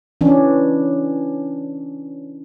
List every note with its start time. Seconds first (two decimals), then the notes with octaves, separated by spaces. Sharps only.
0.21 E3 C#4 D4